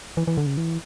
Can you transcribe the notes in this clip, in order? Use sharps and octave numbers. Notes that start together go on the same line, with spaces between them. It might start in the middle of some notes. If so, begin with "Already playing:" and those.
E3
E3
D3
C#3
E3